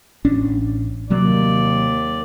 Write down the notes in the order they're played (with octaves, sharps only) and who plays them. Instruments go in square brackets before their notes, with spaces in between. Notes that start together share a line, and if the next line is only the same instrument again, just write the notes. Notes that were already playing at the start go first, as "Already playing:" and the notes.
[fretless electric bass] A1 C#4 D4
[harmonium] D#2 D5 [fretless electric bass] C3 F#3 A#3